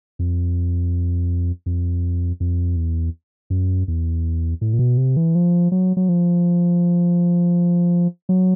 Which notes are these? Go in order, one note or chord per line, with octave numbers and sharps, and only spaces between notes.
F2
F2
F2
E2
F#2
E2
A2
A#2
B2
C3
E3
F3
F#3
F#3
F3
F#3